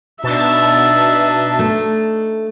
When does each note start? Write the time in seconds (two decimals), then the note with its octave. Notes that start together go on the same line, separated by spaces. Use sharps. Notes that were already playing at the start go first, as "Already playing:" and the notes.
0.24 B2 D4 D#4 E5 A5
1.59 A3